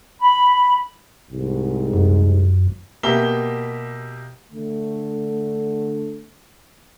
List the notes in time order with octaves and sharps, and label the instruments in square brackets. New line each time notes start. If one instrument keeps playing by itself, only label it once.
[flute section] B5
[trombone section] C2 G#2
[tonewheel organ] F#2
[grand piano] B2 A#3 G4 E5 A#5 G7
[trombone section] D3 A3